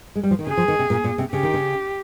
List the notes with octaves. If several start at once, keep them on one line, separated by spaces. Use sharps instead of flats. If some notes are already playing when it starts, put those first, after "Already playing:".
G#3
G3
F3
D#3
C#3 G#4
F3
D#3
C3
A#2
A#2
C3
C#3 G4
D#3
C#3